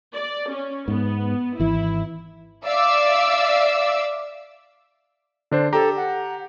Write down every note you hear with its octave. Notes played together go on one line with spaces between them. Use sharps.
D5
C#4
G#2 B3
G#1 E3 E4
D5 E5 F5 D6 E6
D3 D4 C5
G4 A4 A#5
F#5